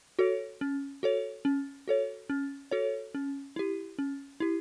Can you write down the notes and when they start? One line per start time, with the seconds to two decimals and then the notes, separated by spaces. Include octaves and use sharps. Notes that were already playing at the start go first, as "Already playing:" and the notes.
0.19 F#4 A4 C#5
0.61 C#4
1.03 F#4 A4 C#5
1.45 C#4
1.88 F#4 A4 C#5
2.30 C#4
2.71 F#4 A4 C#5
3.14 C#4
3.56 E4 G4
3.98 C#4
4.40 E4 G4